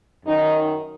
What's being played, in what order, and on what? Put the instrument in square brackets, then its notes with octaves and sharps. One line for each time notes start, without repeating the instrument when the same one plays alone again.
[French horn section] F#2 D#3 D#4